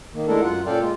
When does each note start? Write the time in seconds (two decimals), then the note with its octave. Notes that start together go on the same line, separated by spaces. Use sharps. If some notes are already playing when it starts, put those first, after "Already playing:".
0.14 D#3 A#3
0.27 G#3 A3 D4 E4 A4 A#4
0.41 F#2 F4 F#5
0.67 A#2 C#4 A4 D5 F5 G5
0.81 G#3 F4